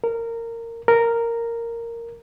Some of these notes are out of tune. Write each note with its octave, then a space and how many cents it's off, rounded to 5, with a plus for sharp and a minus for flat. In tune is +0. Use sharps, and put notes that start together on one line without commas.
A#4 -20
A#4 -10